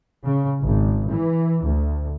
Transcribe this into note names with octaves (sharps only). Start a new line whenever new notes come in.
C#3
G#1
E3
D2